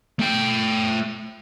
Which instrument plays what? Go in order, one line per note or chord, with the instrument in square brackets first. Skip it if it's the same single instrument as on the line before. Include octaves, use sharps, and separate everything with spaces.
[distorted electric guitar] A3 G5